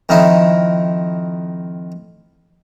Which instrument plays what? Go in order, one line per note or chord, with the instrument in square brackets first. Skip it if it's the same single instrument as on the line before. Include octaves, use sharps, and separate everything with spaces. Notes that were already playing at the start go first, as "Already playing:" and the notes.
[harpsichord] F2 D#3 D#4 E4